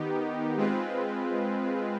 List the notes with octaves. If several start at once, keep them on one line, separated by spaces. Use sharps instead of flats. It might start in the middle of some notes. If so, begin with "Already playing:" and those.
Already playing: D#3 B3 D#4 G4
G#3 C4 F4 B4